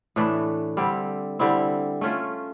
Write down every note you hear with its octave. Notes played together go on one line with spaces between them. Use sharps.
A2 E3 A3 D4
D3 G3 C4 E4
D3 G3 C4 E4
A3 C#4 F4